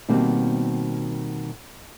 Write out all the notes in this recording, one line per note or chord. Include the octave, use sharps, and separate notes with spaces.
B2 D#3 G3 A#3 C4